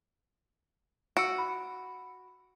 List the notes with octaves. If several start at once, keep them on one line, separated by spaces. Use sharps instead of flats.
F#4 E6 C#7 D7
B5